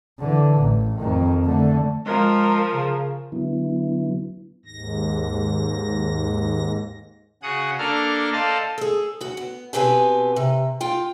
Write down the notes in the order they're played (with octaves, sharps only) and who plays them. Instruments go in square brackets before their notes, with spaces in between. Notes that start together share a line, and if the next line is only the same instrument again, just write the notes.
[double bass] D3 E3
A1
F2 D#3
D3 A3
[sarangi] F3 [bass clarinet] G#3 [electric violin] A#4
[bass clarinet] C#3
[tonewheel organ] D3 F#3 B3 E4
[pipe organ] D#2 G#2 A#6
C#3 F#4 G#4 F#5 D#6
A#3 D4 A4 A#5 F6
A4 C5 D5 D#5 F5 A5
[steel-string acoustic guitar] G#4 A4
D2 F#4
B3
B2 C4 G4 B4 G#5
C3
F4 G5